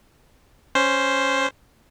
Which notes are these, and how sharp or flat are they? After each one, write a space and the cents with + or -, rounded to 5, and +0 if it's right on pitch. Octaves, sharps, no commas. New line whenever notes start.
C#4 -5 C5 +0